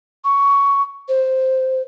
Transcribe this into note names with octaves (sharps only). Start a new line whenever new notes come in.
C#6
C5